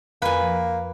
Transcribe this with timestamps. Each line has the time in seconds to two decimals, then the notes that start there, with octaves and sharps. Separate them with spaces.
0.22 F2 A#3 B4 G#5
0.42 F3